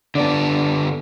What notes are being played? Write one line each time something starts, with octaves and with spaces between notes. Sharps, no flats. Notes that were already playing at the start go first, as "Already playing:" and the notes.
D3 B3 D4 D5 A5